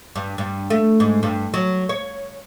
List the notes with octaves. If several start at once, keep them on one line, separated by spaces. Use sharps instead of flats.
G2
G2
A3
G#2
G2
F#3
C#5